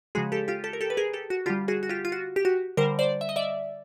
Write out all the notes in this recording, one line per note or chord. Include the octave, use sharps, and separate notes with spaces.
C#3 F3 G#3 F#4 G#4
G4 A4
F4 G4
G4 A4
A#4
G4 A4
B4
G#4 A#4
G4 A4
F#4
D3 G3 F4 G4
F#4 G#4
F#4
F4 G4
F4
F#4
G4
F#4
D3 G3 A#4 C5
C5 D5
E5
D#5
D5 E5